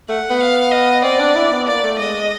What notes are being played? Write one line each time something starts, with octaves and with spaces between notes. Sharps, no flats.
A3 F#5
B3
F5
D#5
C4 D5
D4
E4
B3
A#3 D5
A3
G#3 D#5